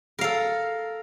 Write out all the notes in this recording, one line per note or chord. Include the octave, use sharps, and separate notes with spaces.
A4 A#4 F5